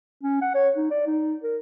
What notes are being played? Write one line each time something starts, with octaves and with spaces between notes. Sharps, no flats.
C#4
F#5
C#5
D#4
D5
D#4
A#4